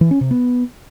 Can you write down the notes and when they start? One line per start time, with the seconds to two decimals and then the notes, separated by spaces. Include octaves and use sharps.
0.01 E3
0.11 C#4
0.21 C3
0.31 B3